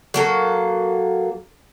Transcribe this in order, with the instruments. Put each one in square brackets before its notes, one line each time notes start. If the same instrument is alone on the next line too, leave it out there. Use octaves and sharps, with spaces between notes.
[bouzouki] F#3 A#3 A4